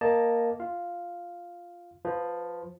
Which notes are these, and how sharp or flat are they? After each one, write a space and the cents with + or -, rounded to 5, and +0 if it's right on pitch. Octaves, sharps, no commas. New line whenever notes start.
A#3 +0 D#5 -5 A5 +0
F4 +0 F5 +0
F3 +10 B4 +30